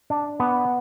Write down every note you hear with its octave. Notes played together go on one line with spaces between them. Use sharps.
D4
B3